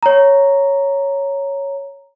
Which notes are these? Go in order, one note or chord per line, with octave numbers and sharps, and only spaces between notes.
C#5 A#5